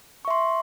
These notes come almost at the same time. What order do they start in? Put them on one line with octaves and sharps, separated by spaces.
C#6 E5 C6